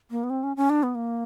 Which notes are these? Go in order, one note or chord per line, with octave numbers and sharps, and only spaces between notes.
A#3
B3
C4
C#4
C#4
D4
B3
A#3